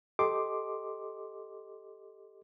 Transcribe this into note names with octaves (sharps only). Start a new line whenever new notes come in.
G4 A4 D#5 C6 D6